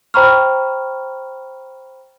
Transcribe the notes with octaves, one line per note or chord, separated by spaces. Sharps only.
C5 G5 A#5 B5 C#6 F6